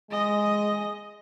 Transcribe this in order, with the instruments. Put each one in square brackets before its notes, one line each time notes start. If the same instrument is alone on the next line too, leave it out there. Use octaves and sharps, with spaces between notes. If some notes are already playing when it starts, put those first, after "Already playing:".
[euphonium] G#3 [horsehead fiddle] D#5